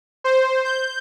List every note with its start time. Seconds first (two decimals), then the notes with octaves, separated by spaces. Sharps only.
0.24 C5
0.65 G6